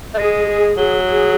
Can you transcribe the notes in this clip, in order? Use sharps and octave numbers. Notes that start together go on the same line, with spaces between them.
A3
G#3 G#4
G#4
F#3 G#4
G#4